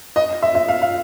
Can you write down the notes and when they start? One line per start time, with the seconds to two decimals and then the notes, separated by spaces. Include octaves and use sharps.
0.16 D#5
0.42 E5
0.55 E5
0.68 F5
0.82 F5